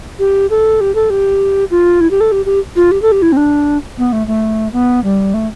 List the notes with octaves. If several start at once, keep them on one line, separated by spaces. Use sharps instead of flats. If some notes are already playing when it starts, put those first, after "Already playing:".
G4
A4
G4
A4
G4
F4
E4
G4
A4
G4
G4
F4
G4
A4
G4
E4
C4
D4
B3
A3
A3
B3
G3
A3